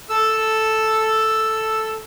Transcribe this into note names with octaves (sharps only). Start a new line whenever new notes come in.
A4 E6